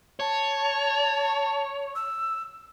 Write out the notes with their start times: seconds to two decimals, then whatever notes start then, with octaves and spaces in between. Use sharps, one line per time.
0.20 C#5 A5
1.95 E6